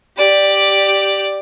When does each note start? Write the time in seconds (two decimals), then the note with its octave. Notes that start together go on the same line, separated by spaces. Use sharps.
0.18 G4 D5